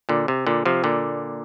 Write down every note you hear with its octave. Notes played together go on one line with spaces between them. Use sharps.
A#2 D3
C3
A#2 D3
C3 F3
A#2 D3